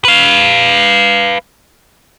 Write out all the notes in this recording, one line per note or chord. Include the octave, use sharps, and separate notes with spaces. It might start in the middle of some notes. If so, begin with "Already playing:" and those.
B4 F5